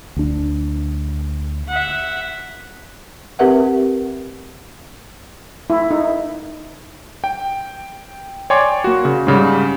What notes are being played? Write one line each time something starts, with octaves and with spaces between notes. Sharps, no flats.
D2 D4
E5 F#5
C4 G4 A#4 B4 E5 F#5
E4
D#4
G5
C#5 D5 G5 G#5 C6 D6
A#3 F#4
C#3
G#2 C#3 G3